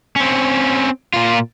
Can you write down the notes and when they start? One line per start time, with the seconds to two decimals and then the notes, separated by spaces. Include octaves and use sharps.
0.16 C4 C#4
1.14 A#2 F4